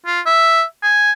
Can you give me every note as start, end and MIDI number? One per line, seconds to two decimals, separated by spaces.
0.06 0.20 65
0.26 0.63 76
0.83 1.12 80